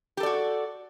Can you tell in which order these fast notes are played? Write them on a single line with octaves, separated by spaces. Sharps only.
G4 A4 D5 F#4